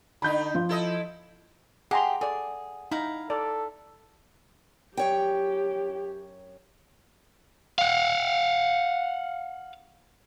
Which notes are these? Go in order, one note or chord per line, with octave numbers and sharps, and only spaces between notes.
D3 D#4 B5 G6
F3
E4 A4 D#5
G4 G#4 D#5 F#5 G#5 A#5 C6
G#4 A4 D5
D#4 E4 F5 A#5
A4 D5
F#2 G4 C#5 G5
F5 F#5